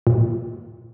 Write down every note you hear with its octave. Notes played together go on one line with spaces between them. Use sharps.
A#2